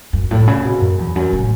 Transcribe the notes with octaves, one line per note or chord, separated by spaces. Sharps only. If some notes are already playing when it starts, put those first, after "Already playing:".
F#2
A2
C#3
B2
F#2
E2
F#2
A2